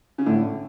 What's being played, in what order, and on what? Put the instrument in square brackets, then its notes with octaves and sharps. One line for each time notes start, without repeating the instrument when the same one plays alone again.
[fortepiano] C#3
[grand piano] A2 [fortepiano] D3